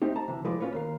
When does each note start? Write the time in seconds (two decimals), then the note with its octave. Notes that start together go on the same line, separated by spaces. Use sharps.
0.02 A3 C4 D#4 G4
0.16 A5 A#5
0.28 C3 E3
0.44 F3 G#3 A3 E4 B4 D5
0.60 C#4 D4 F4 B4 C#5
0.72 D#2 A#4 F5